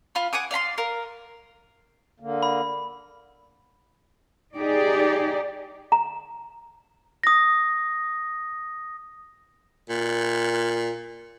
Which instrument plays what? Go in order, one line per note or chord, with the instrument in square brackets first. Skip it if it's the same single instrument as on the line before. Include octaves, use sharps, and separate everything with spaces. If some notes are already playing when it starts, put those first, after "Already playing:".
[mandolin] F4 F5 B5
F#5 G#5 D6 D#6
D5 F5 B5 C6
A#4 F5
[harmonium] D3 A#3
[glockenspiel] B5
[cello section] D#4 G4 G#4 D5
[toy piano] A#5
[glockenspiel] D#6 A#6
[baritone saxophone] A#2